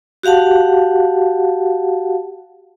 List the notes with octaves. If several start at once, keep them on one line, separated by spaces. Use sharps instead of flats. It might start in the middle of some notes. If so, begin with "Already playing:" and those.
F#4 G4 F5 F#5 A5